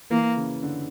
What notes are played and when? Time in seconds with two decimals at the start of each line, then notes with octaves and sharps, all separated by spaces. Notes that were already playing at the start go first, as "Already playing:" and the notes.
0.11 E3 A#3
0.36 C#3
0.63 D3